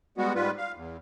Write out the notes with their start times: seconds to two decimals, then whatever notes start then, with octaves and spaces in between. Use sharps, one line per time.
0.18 G3 G#3 B3 F#4
0.35 G#2 G3 F4 B4
0.58 F5
0.76 E2